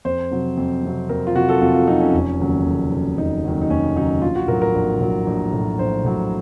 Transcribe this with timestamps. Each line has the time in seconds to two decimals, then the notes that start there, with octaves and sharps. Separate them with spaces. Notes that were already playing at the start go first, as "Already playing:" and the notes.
0.05 F2 C5
0.31 C3 F#3
0.57 F2
0.83 C3 F#3
1.09 F2 A#4
1.27 F4
1.35 C3 F#3 F#4
1.49 A4
1.61 F2 F4
1.75 F4
1.88 C3 F#3 D#4
2.01 C#4
2.14 F1
2.40 D#2 C#3 F#3
2.66 F1
2.92 D#2 C#3 F#3
3.18 F1 D#4
3.44 D#2 C#3 F#3
3.61 D#4
3.70 F1 C#4
3.96 D#2 C#3 F#3 D#4
4.22 A#1 F4
4.36 F#4
4.48 A2 F#3 A#4
4.62 A#4
4.74 A#1
5.00 A2 F#3
5.27 A#1
5.53 A2 F#3
5.79 A#1 C5
6.04 A2 F#3